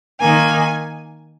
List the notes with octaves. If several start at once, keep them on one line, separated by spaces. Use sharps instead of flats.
D#3 A#3 G#5